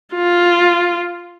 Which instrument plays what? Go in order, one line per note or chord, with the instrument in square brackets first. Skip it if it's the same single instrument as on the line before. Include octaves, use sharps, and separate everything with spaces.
[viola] F4